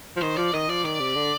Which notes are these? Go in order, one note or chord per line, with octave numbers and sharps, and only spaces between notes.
F3
D#3 C5
F3 D5
D#3 D#5
F3 D5
D#3 D5
C3
D3